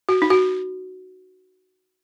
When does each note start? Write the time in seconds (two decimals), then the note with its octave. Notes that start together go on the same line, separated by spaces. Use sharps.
0.09 F#4
0.22 D#4
0.30 F#4